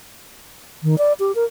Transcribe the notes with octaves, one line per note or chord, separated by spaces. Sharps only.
D#3
D5
G4
A#4